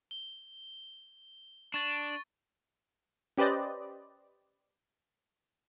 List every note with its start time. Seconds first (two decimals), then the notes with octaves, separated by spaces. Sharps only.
0.11 G7
1.74 D4 C#6 A6
3.38 C#4 G4 B4 C5 D5 D#5